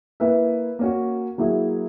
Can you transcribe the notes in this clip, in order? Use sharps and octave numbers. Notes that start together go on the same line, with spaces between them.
A#3 E4 B4 E5
A#3 C#4 F#4
F#3 A#3 E4 G#4